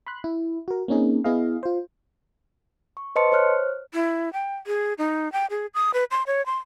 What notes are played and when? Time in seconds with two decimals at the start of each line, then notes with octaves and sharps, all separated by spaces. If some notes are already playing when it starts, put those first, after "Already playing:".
0.07 B5 C6 F#6
0.24 E4
0.68 F#4 A#4
0.88 A#3 C4 C#4 D#4 G#4
1.24 B3 E4 G#4 D#5 F5
1.63 F4 C5
2.97 C#6
3.16 B4 C5 D#5 A5 C6 C#7
3.32 C5 C#5 F6 F#6
3.92 E4
4.33 G5
4.67 G#4
4.98 D#4
5.32 G5
5.50 G#4
5.74 D#6
5.94 B4
6.11 C6
6.27 C#5
6.46 C6